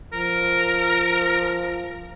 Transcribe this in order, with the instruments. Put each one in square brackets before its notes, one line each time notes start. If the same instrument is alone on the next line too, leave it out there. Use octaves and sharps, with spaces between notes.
[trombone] F3 [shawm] A#4